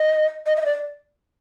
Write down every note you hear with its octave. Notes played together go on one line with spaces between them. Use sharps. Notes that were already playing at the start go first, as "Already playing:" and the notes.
Already playing: D#5
D#5
E5
D#5
D5